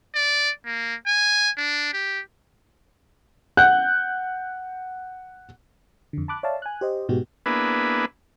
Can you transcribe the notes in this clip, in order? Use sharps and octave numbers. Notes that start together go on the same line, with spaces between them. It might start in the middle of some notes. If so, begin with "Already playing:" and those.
D5
A#3
G#5
D4
G4
F#5 F#6 G6
F2 D3
A5 B5 D6 F#6
C#5 D5 E5 F5 A5
G#5 F#6
G4 C5 D#5
G#2 B2 G#3 B3 F#4 G4
A#3 B3 D4 E4 G#4 B4